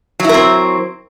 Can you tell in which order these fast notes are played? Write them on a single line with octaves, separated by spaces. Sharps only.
F#3 E4 A#4 C4